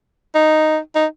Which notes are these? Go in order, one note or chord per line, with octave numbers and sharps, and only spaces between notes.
D#4
D#4